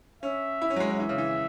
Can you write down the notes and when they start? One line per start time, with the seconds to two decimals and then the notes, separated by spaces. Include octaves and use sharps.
0.23 C#4 E5
0.62 E4
0.70 C#4
0.76 F#3
0.80 G#3
0.90 F#3
1.00 E3 E5
1.09 C#3
1.18 E3